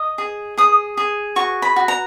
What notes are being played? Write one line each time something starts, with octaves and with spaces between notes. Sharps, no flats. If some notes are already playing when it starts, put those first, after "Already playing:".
Already playing: D#5 D#6
G#4
G#4 D#6
G#4
F#4 C#6
B5
F#4
A#5